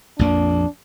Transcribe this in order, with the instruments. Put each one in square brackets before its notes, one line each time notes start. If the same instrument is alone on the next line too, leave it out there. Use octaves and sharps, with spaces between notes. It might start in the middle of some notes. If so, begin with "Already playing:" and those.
[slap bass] A#1 F2 A#3 [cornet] D4